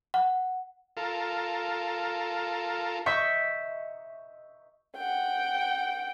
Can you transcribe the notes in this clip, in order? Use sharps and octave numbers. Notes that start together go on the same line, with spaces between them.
F#5
F4 A4 A#4
D#5 E5 C#6 G6 B6
F#5 G5